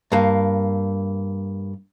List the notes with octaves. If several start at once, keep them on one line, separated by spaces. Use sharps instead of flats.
G2 A#3